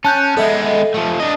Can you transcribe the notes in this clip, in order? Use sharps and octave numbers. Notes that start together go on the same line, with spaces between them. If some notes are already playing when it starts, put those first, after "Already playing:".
C#4 A5 F#6 G6
G#3 B3 A4 D#5 E5
F3 A3
D4 D#5